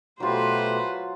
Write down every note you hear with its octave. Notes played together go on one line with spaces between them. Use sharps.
B2 F#3 A3 F4 G4 B4 C5